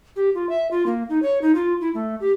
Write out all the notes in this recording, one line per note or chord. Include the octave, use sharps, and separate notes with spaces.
G4
F4
E5
F4
A#3
D#4
C#5
D#4
F4
E4
A3
G4